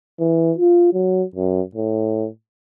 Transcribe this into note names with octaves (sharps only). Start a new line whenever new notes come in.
E3
F4
F#3
F#2
A2